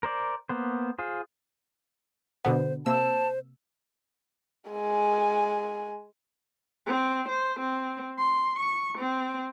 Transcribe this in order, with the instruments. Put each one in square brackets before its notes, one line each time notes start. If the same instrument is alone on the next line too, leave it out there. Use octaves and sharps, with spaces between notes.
[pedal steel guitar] A#4 C5 D5
A#3 B3 C5
F4 G#4 C5
[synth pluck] B2 D3 B3 [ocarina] C5
[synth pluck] C3 A#3 E6 [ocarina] C5 [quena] A5
[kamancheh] G#3 G#5
[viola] C4
C5
C4
C6
C#6
C4